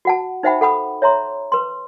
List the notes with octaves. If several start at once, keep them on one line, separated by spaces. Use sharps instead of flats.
F#4 F#5 A5
D#4 C5 E5 F#5 G5 B5
A4 F#5 B5 D#6
C#5 E5 A#5 C6
B4 C6